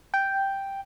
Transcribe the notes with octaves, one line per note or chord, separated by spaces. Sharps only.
G5